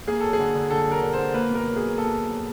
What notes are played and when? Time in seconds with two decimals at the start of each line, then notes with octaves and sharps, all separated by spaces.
0.07 A#3 G#4
0.21 F#3 A4
0.33 G#4
0.39 D3
0.55 D3
0.70 D3 A4
0.86 F#3
0.92 A#4
1.02 D3
1.13 D3 C5
1.34 A#3 B4
1.50 B2 A#4
1.66 F#3
1.76 G#4
1.82 F#3
1.98 A#3 A4
2.13 F#3
2.29 F#3